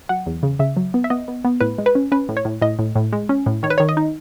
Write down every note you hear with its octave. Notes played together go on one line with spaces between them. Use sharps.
F#3 F#5
E2
C#3
C#3 E5
F#3
B3
E5
B3 D#5
B3
B3
A2 B4
G#3
B4
C#4
C#4 B4
A2
C#5
A2
A2 D#5
A2
A2
G#3
C#4
A2
D#3 C#5
B4
D#3 C#5
D#5
D#4